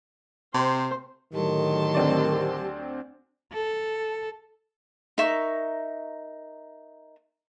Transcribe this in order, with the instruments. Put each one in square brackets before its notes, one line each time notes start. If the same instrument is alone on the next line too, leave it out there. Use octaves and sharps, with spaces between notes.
[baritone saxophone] C3 [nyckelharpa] C5
[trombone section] A2 D3 D#3 [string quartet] F#3 A5 C6 [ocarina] G4
[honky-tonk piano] D2 C4 D5
[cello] A4
[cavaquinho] D#4 A#4 E5 C#6